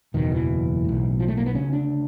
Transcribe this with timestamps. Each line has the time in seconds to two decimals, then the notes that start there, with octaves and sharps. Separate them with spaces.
0.14 F#1 E2 B2 D#3
0.32 E3
0.85 B1 A2
1.20 F3
1.28 A3
1.37 A#3
1.46 B3
1.55 D2 C#3 C#4
1.73 D4